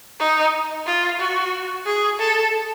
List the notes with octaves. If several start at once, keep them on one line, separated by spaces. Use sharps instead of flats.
D#4
F4
F#4
G#4
A4